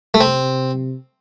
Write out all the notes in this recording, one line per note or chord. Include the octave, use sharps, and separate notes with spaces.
A3
C3 C4